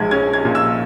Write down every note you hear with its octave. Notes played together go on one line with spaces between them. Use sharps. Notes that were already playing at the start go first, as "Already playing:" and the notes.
Already playing: A#1 G#3 G#6
C#4 G#6
G#6
A#2
E6